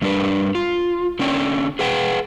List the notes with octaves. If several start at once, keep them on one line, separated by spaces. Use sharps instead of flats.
G2 G3 D4 A#4 B4
F4
D3 C#4 C#5 D5 G5
G#4 B4 F#5 G5